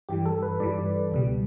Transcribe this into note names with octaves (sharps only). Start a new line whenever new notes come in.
G2 E3 G3 G4
A4
B4
G2 E3 G3 D5
C#2 B2 G3